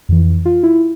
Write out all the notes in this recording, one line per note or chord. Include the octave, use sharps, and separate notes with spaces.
F2 E3
F4
E4